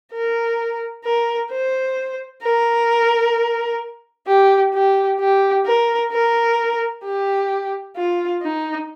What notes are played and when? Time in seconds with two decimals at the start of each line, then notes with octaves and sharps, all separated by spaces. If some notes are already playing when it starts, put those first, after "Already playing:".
0.13 A#4
1.05 A#4
1.51 C5
2.43 A#4
4.27 G4
4.74 G4
5.20 G4
5.66 A#4
6.12 A#4
7.04 G4
7.97 F4
8.42 D#4